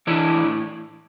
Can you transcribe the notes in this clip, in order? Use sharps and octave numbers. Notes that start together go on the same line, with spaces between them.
E3 D4 E4
A2